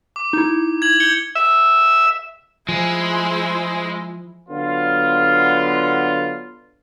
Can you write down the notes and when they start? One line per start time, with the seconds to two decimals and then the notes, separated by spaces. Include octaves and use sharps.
0.16 D6
0.33 D#4 E4
0.82 G#6 F#7
1.00 G6 C#7 G7
1.35 E5
2.69 F3 G#3 E4 G#4 C5
4.49 D3 F#3 B3 F4